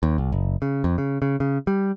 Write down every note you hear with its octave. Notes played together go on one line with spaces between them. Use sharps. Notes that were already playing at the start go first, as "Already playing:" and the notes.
D#2
C2
F#1
C#3
F2
C#3
C#3
C#3
G3